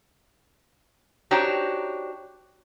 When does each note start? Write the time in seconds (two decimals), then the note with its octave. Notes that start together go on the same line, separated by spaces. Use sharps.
1.31 D4 D#4 F#4 G4 C5 C#5